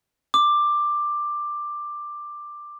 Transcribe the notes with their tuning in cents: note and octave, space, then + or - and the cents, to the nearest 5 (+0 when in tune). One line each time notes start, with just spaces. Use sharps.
D6 +10